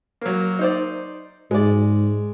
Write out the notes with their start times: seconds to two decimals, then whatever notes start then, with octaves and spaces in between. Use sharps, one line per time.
0.21 F#3 A#3
0.59 D#4 C5 D5
1.51 G#2 G#3 D5